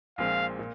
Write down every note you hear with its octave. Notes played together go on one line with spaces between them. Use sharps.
A#1 A#2 G#3 C4 F5
A#2